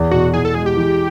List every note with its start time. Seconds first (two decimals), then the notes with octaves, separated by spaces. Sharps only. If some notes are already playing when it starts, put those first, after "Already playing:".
Already playing: E2
0.11 B2 F#4
0.34 E3 G#4
0.45 A4
0.54 G#3 G#4
0.66 G4
0.77 E3